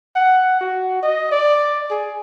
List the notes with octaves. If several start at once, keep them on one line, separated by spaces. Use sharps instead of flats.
F#5
F#4
D#5
D5
G#4